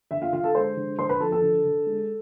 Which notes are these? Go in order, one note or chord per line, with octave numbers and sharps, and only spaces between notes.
D3 E5
F4 F5
D3 F4 F5
A4 A5
G#3 C5 C6
D3
D3 C5 C6
B4 B5
F3 A4 A5
A4 A5
D3
D3
G#3